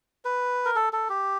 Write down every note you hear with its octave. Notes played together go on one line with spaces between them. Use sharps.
B4
A#4
A4
A4
G4